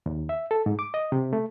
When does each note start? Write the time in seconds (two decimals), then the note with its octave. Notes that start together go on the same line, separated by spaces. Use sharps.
0.06 D#2
0.29 E5
0.51 A4
0.66 G#2
0.79 D6
0.94 D#5
1.12 C3
1.33 A3